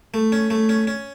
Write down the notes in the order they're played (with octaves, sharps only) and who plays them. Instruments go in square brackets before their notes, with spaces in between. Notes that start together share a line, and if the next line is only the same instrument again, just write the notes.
[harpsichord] A3
C#4
A3
C#4
C#4